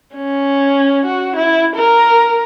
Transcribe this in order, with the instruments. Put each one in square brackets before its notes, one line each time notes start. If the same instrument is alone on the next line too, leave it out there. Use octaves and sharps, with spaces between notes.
[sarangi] C#4
F#4
E4
A#4